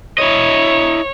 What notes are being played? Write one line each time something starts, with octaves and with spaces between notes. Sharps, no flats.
E4 C#5 D#5